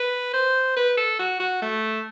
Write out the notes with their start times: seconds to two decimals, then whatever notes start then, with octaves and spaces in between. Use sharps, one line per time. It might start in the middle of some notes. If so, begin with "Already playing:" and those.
Already playing: B4
0.33 C5
0.76 B4
0.97 A4
1.19 F#4
1.40 F#4
1.62 A3